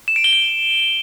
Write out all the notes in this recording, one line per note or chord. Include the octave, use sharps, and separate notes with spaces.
E7
D7
G7
D7